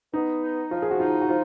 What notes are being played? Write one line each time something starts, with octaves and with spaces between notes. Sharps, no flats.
B3 D#4
D#4
F3 F4
G#4
F#4
D#4 F4
F#4
F3 F4